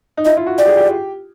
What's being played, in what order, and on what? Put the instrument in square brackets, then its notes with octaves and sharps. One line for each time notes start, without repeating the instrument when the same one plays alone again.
[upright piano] D#4
[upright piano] E4 [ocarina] D#5
[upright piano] F4
F#4
[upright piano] G4 [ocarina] D5
[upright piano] G#4
G4